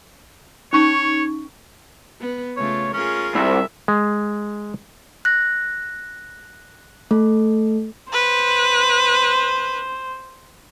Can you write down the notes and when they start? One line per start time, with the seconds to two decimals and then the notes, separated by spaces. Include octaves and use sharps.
0.73 C#4 D#4 C#5 C#6
2.20 B3
2.57 C#3 A3 F4 C#5
2.94 C#4 F4 G#4 A#4
3.35 C2 E5
3.88 G#3
5.25 F#6 A#6
7.11 A3 A4
8.13 B4 C5